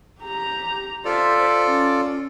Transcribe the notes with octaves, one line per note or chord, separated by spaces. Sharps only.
G4 A#5
F4 A4 C5 D5 E5
C#4